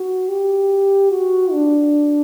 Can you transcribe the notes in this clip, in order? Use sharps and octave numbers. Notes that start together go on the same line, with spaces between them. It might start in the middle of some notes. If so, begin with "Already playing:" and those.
Already playing: F#4
G4
F#4
D4